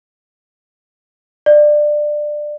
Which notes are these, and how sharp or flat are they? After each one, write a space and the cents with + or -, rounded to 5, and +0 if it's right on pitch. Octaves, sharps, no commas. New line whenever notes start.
D5 +20